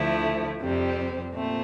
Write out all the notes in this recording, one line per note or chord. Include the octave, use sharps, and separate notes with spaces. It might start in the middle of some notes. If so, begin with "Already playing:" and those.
Already playing: D2 D3 F3 A3 E4
F2 C3 G3 C4
A#2 A3 C4